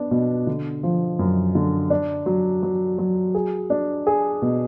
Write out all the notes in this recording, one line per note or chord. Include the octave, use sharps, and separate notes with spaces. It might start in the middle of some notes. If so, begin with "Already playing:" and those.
Already playing: B3 D4
B2
D3
F3
F#2
D3
D4
F#3
F#3
F#3
G#4
D4
G#4
B2